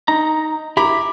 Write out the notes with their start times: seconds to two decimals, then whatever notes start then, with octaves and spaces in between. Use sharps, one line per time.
0.08 D#4 A#5
0.77 E4 G4 A#5 B5 D6